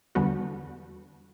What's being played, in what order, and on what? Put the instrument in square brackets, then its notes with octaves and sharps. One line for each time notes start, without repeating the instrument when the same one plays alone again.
[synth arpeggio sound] E2 D3 G3 B3 F#4